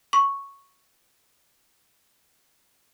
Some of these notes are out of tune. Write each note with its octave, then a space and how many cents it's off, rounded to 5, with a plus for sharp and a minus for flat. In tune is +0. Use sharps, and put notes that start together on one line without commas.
C#6 +0